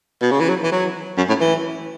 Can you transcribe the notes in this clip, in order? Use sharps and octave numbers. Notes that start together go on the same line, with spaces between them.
B2
C#3
E3
F#3
E3
F#3
F#2
A2
E3